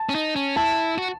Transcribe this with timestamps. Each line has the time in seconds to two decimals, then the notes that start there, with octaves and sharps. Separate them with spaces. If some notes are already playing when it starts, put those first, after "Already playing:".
Already playing: A5
0.09 C#4
0.15 D#4
0.36 C#4
0.56 E4 A5
0.98 F#4